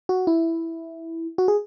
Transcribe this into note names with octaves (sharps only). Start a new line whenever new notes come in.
F#4
E4
F#4
G#4